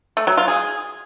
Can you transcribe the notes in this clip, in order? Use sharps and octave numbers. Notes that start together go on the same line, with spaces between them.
A3
F#3
F4
G#4